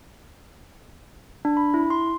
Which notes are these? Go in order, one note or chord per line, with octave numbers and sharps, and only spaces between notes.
D4
B5
E4
C6